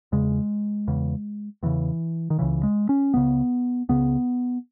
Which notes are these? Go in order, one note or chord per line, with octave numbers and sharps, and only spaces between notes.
E2 C#3 G#3
E2 C#3
E2 C#3 E3
D#3
C#2 C#3 E3
G#3
C#4
C#2 C#3 B3
C#2 C#3 B3